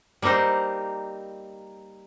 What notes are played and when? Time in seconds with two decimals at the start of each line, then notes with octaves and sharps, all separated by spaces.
0.22 G3 A#3 C4 D#4 C5